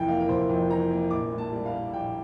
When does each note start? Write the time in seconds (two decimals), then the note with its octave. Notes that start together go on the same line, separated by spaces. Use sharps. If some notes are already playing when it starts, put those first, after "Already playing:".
Already playing: F1 F2 E3 G5
0.08 A#3 F5
0.20 A#4
0.29 F1 C5
0.49 F2
0.69 E3 A#5
0.91 A#3
1.10 A#1 D6
1.32 A2
1.38 A5
1.52 G3
1.66 F5
1.72 A#3
1.94 A#1 G5